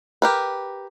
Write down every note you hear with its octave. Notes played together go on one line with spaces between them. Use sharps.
G4 A#4 B4